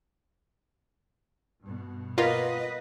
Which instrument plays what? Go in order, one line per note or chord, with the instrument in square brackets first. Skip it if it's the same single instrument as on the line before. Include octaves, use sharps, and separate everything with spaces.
[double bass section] G2 B2
[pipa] A#3 B3 [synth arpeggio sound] F4 [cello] B4 D#5